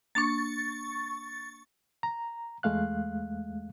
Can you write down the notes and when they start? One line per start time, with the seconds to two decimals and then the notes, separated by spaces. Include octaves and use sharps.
0.15 A#3 D4 C#6 D6 A6
2.03 A#5
2.63 E2 G#3 A3 F5 F#6